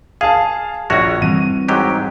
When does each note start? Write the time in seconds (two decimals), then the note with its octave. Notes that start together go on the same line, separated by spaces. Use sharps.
0.21 G#4 F5 A5
0.90 A#1 F#4 C#5 A#6
1.22 E3 G3 C4 D#7
1.68 G#2 F#3 G4